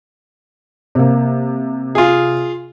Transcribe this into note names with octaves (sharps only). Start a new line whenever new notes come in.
C3 A#3
F4 G#4